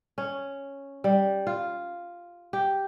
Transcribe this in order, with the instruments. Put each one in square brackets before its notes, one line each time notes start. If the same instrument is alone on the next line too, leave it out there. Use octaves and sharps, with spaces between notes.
[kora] C#4
G3
F4
G4